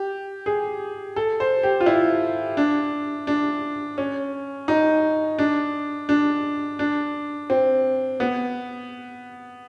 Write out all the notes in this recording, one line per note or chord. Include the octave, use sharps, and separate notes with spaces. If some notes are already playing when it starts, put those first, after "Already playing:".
Already playing: G4
G#4
A4
C5
G4
F4
E4
D4
D4
C#4
D#4
D4
D4
D4
C4
B3